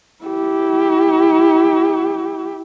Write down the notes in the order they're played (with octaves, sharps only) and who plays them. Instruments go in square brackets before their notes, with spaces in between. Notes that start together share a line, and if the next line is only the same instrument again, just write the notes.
[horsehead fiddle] E4 G4